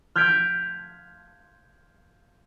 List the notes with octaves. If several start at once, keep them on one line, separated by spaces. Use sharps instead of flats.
F6 G6 G#6 B6 D7